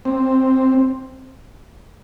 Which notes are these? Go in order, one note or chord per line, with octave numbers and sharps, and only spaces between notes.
C4